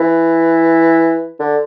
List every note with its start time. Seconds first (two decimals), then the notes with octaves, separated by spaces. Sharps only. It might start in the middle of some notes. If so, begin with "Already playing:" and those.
Already playing: E3
1.40 D3